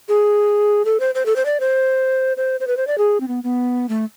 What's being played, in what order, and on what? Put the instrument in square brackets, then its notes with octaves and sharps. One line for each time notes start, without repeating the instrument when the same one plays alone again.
[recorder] G#4
A4
C5
C5
A4
C5
D5
C5
C5
C5
B4
C5
D5
G#4
C4
B3
B3
A3